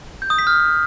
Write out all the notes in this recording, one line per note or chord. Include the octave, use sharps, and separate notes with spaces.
G6
D#6
B6
F6